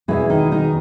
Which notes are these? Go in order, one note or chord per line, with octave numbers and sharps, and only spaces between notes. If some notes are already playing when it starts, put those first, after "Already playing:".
E2 B2 E3 G#3 E4
D#3 D#4
D#3 D#4